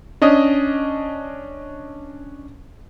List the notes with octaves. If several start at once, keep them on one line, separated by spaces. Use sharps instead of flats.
C#4 D4 D#5 D#6